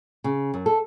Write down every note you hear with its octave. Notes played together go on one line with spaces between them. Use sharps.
C#3
F#2
A4